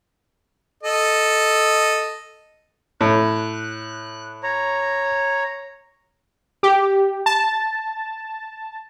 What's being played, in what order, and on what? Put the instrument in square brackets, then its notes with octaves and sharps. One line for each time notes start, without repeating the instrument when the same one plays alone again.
[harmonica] A4 D#5
[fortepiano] A2 [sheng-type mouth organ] F#6
[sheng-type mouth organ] C#5 A#5
[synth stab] G4
A5